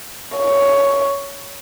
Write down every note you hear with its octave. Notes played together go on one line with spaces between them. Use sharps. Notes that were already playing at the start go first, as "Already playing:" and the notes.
C#5